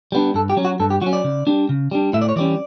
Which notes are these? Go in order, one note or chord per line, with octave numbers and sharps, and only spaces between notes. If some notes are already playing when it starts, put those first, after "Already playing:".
G3 B3 D4
G2 A4
G4
F#3 C#4
F#4
G2 A4
G4
F#3 C#4 F#4
D5
C#3
G3 D4
C#3
G3 D4
A2 E5
D5
C#5
E3 G3 C#4 D5